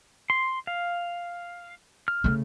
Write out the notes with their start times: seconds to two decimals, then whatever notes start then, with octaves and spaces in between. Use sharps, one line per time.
0.30 C6
0.67 F5
2.08 F6
2.24 C#3 A3